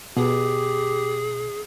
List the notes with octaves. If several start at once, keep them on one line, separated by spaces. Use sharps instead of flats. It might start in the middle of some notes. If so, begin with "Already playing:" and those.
B2 G4 G#4